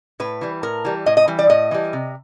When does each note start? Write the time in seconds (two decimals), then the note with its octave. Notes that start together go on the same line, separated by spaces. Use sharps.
0.20 A2 B4
0.41 E3 G3
0.63 A2 A#4
0.85 E3 G3
1.06 A2 D#5
1.17 D#5
1.28 E3 G3
1.39 D5
1.50 A2 D#5
1.71 E3 G3
1.93 C3